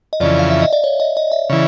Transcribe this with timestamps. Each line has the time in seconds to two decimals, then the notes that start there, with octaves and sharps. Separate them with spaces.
0.13 D#5
0.20 F2 C#3 E3 D5
0.39 F5
0.50 E5
0.62 D#5
0.73 D5
0.84 C#5
1.00 D#5
1.17 D#5
1.32 E5
1.49 C#3 E3